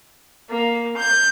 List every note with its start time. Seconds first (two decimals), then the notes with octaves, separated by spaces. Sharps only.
0.49 A#3
0.96 G6